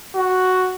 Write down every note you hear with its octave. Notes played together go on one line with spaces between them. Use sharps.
F#4